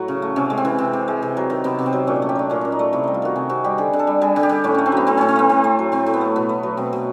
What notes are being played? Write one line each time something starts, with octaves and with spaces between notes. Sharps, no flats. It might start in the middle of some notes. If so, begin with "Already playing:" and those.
Already playing: A2 F#3 F#4
C#3
A3
C3 C#4
G#3
C4
E3
C3
C3
G#3
C3
F#3
D#3
C3 B3
C3
C4
F#3
A#2 C#4
A3
G4
F#3 D4
A#2 C#4
A#2 D4
D#4
A3
C3 E4
G3 D#4
F4
D#3 F#4
C3 G#4
C3 F#4
G3 G4
D3 G#4
D3
A4
G3
G3 G#4
D3
G4
D3
A2 C#4
A3 C#4
C4
F#3 B3
A2 C4
A2 C4
C4
A3 B3
A2 C4
A3
F#3
A2 C4
A2
B3
A3
B2 B3
A3
F#3
B2 C4
B2